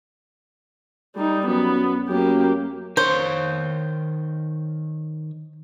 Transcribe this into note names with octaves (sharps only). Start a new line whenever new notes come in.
G3 D#4
F#2 B3
F#2 A#3 G4
D#3 C5 C#5